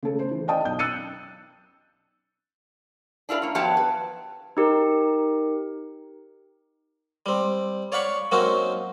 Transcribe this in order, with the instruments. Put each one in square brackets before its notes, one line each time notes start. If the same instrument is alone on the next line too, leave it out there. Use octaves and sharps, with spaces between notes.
[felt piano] C#3 A3 A4
C5
E3
D5 D#5 F5 G5 A5 D#6
B1 G6
E6 F#6 A6 C#7 D#7
[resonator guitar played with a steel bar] D4 E4 F4 A4 B4
A#3 C#4
F3 F#3 B3 G4 E5 A5
B4
[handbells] D#4 G4 A#4
[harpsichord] G3 C4
C#5 D5 F5 F#5 B5 C#6
F#3 A#3 C4 C#4 D#4 F#4